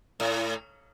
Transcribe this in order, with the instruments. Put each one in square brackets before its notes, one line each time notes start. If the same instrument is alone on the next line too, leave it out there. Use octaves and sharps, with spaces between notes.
[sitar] A2